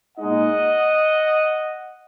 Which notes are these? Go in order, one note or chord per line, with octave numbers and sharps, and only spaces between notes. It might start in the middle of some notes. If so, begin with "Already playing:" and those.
A#2 G#3 D#4 D#5 F#5